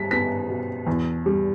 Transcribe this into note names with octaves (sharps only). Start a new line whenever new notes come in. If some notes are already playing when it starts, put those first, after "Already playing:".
Already playing: G3 B6
B3 B6
B2
E2
G3